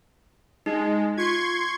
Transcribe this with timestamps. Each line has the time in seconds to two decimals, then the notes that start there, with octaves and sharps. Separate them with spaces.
0.66 G#3 D#4
1.17 F4 C6 C#6 G#6